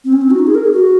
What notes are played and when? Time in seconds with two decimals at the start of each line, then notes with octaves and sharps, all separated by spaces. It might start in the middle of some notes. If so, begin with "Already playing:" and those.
0.05 C4
0.13 C#4
0.21 C4
0.31 F#4
0.39 D#4
0.47 G#4
0.55 A#4
0.64 G#4
0.72 F#4